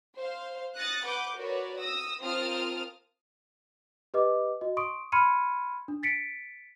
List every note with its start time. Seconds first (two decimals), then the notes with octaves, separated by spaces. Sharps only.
0.16 C5 F5
0.76 D#6 F#6 A6 A#6 C#7
1.05 B4 F#5 D6 G6
1.37 F#4 A#4 B4 C#5 D5
1.80 D#6 E6 A#6
2.22 C4 F4 A#4 A5 D#6 F6
4.14 G4 B4 D#5 D6
4.61 F#4 D#5
4.77 C6 C#6 D#6 D7
5.12 B5 C6 F6 G#6 C#7 D#7
5.88 D4
6.03 A6 B6 C#7 D7